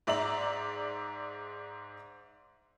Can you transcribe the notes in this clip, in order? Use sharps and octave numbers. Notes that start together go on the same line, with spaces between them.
G#2 D5 E5 A#5 F#7